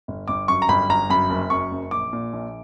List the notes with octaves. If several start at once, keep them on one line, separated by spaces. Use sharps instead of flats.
G1
G1 D6
F#2 C#6
A#5
G1 B5
G1 A#5
F#2 B5
F#1
F#2 C#6
F#1
A#1 D6
A#2
A#1